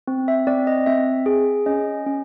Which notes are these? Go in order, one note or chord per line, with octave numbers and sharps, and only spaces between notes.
C4
E5
C4 D5
D#5
C4 E5
G#4
C#4 D#5
C#4